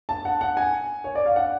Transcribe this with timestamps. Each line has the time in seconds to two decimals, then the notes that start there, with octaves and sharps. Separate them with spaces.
0.09 A5
0.25 F#5
0.41 F#5
0.57 G#5
1.04 C#5
1.15 D5
1.26 F5
1.36 F#5